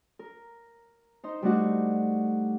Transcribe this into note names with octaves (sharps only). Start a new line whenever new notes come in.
A#4
D#4 C5
G3 A3 D4 D#4 F#4